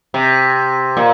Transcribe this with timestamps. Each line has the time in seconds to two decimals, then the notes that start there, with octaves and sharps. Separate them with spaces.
0.14 C3
0.97 A#2